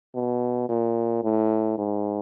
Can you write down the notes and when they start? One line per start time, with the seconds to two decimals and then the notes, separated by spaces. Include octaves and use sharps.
0.15 B2
0.69 A#2
1.24 A2
1.78 G#2